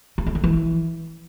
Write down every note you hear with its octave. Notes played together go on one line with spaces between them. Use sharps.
C#3
A3
D3
E3